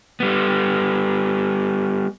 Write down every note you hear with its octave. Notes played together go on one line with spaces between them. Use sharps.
G3 B3